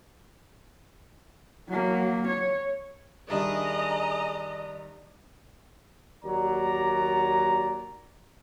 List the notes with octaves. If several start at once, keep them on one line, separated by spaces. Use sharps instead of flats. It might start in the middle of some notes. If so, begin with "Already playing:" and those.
F#3 A#3
C#5
D#3 G3 D4 G#4 D#5 E5 A#5
D#2 F#3 D5 A#5